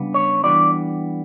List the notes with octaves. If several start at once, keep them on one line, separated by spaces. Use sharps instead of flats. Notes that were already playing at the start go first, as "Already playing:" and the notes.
Already playing: C#3 G3 B3 D4
C#5
E3 G3 B3 D4 D5